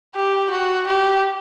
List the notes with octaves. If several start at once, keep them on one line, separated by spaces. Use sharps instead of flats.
G4
F#4
G4